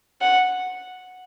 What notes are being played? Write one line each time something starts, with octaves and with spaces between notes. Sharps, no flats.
F#5